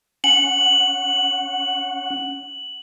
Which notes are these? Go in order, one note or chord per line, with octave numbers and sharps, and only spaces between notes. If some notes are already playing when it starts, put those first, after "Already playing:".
C#4 F#5 F#7